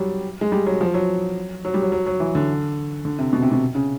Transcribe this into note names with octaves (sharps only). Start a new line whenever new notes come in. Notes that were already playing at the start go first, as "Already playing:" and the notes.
Already playing: F#3 G3
G#3
G3
F#3
F3
F#3
F#3
G3
F#3
F#3
F#3
E3
D3
D3
C3
B2
C3
B2
C#3